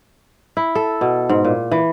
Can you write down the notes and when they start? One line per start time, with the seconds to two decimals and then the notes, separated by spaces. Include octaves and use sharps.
0.57 E4
0.75 A4
1.01 B2
1.29 G#2
1.45 A#2
1.71 E3